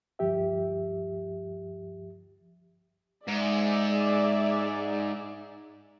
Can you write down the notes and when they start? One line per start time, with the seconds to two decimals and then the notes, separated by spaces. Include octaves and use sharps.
0.19 D2 G2 F3 G4 E5
3.28 G#2 G#4 D5 E5